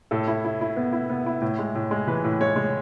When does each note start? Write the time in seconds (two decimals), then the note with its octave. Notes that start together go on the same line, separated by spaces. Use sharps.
0.11 A2 A4
0.28 E4
0.45 E4
0.61 E4
0.76 B3
0.93 E4
1.09 B3
1.26 E4
1.42 A2
1.59 G#3
1.75 A2
1.91 G#3
2.07 E3 B4
2.24 A2
2.41 G#3 C#5
2.56 G#3